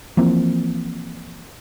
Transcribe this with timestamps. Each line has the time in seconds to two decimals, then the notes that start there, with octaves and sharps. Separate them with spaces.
0.17 E3 F3 A#3 C4